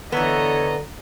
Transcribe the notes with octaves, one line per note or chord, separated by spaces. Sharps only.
D3 E3 B3 A4 C#5 D#5 A#5